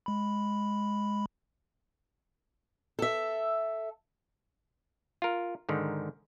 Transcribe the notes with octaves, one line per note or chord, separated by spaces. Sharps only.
G#3 B5
A4 E5
F4 A#4
G#2 D3 D#3